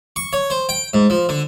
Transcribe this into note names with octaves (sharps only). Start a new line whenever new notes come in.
C#6
C#5
C5
G5
G#2
F3
D3